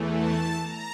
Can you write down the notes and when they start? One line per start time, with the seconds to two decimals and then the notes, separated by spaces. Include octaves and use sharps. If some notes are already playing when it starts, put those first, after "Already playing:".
Already playing: E2 E3 A3
0.14 A5
0.62 A#5